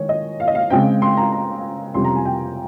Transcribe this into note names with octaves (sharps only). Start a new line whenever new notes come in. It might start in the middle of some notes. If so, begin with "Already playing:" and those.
Already playing: D#3 G#3 C#5
D#5
F5
D#5
F5
C#3 G#3 C4 G5
C6
A#5
A#5
F2 C3 G3 C#4 C6
A#5
G#5
G5